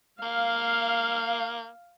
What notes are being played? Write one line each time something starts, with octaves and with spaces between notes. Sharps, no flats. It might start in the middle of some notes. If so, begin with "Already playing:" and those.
A#3 F5